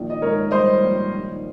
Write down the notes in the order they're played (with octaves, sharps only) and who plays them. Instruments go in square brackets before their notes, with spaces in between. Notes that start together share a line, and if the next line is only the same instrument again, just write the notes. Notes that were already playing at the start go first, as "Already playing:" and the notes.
Already playing: [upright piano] A#1 D#3
D#5
G#2 A#4 C#5
G3 C5 D#5
A#1
D#3